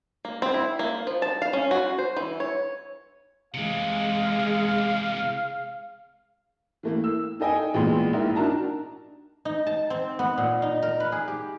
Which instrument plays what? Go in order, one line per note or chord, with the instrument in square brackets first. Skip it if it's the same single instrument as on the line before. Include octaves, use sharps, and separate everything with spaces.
[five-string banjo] A#3
C4
E4
A#3
F3
A5
F5
C#4
F#4
C5
E3
C#5
[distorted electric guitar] C3 E3 [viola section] G#3 [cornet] F5
[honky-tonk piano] E3 A3 A#3
E6
D#4 A4 D#5 G5 G#5
A1 A#2 G#3 B3 C6
A#1 G#2 E4 A#4
D4 D#4 F#4 A#4 A5 A#5
[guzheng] D#4
A5
C4
B3
A#2
D#4
A#4
B4
G#4
G4